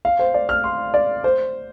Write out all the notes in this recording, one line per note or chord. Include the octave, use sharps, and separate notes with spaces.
F5
C5
D5
F6
C6
D5
C5